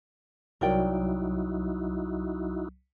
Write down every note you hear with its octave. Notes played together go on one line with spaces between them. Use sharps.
C2 F#3 D#4 E4 F#4 A#4 D5 G5